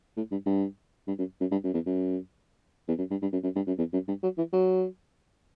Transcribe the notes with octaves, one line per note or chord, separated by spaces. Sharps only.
A2
G2
G2
G2
F#2
F#2
G2
F#2
E2
F#2
E2
F#2
G2
G2
F#2
F#2
G2
F#2
E2
F#2
G2
F#3
E3
F#3